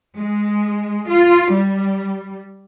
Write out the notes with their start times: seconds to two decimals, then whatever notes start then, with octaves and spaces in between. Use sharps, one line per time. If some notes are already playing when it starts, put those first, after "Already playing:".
0.17 G#3
1.09 F4
1.52 G3